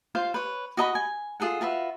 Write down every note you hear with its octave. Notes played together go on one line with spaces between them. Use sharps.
F4 C5 F5
B4 C#5
F#4 D#5 A#5 B5
G#5
F4 G#4 A4 F#5
F4 F#4 B4 E5